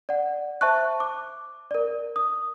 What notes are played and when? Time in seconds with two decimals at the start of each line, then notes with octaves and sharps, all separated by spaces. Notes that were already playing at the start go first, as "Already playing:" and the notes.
0.09 D5 F#5
0.61 C5 E5 A5 C#6 F#6
1.00 D6
1.71 A#4 D5
2.16 D#6